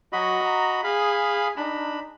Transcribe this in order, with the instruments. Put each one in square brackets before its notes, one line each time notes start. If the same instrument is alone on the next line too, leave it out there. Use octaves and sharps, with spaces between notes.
[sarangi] F#3 [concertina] F#4 D#5 B5
[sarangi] A#5
[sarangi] G#4 [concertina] F5 B5
[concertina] D4 B5 [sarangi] D#4